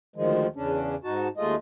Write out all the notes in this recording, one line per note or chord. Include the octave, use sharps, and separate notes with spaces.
D2 D#3 F3 G#3
E2 C#3 C#4 D4
G#2 D#4 F#4 A5
D#2 G#3 A3 F4 D#5